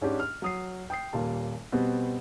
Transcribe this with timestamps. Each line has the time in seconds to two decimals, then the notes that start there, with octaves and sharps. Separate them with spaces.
0.01 G#2 C#4 D4 G4
0.20 F6
0.42 F#3 D#6 C7
0.90 G5 D#6 C7
1.13 D#1 A#2 G3 A5
1.72 B2 G3 B3 C4